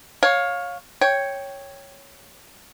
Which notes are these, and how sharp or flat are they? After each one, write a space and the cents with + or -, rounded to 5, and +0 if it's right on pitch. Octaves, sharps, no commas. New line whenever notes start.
C#5 +0 F5 +20
C#5 +0 G5 +0